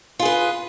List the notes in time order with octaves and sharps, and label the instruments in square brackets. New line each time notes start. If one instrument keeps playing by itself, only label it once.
[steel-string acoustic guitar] F4
G#4
B4